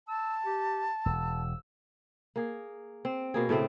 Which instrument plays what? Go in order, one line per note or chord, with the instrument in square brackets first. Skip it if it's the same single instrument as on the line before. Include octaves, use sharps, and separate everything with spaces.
[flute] A5 [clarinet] E6
[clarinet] G4
[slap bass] E1 [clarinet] E6
[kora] A#3 G#4
C4
B2 A#3 G#4
A2 C#3 A3 C4